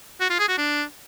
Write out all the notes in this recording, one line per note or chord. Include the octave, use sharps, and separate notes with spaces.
F#4
F4
G#4
F#4
D4